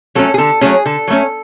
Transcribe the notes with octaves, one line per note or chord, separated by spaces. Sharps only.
F#3 A3 C#4 A4
G#4
D3 A4
F#3 A3 C#4 G#4
D3 A4
F#3 A3 C#4